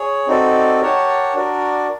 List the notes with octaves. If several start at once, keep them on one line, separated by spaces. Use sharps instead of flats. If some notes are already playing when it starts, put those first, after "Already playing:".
Already playing: G#4 C#5
C4 D#4 F#4 A4 D5
G4 A#4 C#5 F#5 A5
D4 F#4 A#4 D5